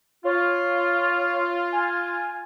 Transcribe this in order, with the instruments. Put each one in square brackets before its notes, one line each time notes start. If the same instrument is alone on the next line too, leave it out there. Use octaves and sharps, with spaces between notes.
[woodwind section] F4 [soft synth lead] C#5
[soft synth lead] G#5